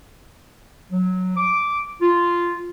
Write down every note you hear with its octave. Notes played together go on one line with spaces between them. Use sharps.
F#3
D6
F4